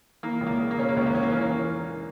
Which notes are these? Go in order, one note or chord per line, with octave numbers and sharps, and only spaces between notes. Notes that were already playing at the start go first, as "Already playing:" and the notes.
E3 A#3
C#2
A#3
C#3
A#3
C#3 C#4
A#3
C#2 C#4
A#3
E3 C#4
A#3
E3 C#4
A#3
E3